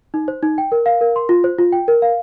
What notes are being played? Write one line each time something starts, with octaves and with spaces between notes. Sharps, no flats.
D#4
C5
D#4
G5
A#4
F5
A#4
C6
F4
C5
F4
G5
A#4
F5